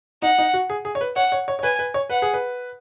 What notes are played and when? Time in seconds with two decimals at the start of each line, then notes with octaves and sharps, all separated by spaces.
0.22 D#4 F#5
0.38 D#4
0.53 F#4
0.70 G#4
0.85 G#4
0.95 C#5
1.01 B4
1.16 C#5 F#5
1.32 C#5
1.48 C#5
1.59 C#5
1.63 B4 G#5
1.79 B4
1.94 C#5
2.09 B4 F#5
2.22 G#4
2.34 B4